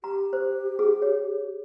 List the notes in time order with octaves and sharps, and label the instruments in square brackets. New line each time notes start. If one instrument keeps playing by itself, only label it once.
[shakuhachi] G4 [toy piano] A#5
[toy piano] C5
G#4
C#5